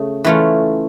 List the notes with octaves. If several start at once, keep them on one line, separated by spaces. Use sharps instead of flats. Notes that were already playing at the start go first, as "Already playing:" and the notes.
Already playing: C#3 A3
E3 A3 C#4 F4